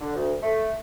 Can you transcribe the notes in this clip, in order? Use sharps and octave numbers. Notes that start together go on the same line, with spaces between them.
D3
D2
A3